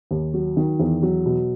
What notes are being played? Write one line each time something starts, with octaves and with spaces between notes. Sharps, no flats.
D#2
F#3
D#3
E2
F#3
B2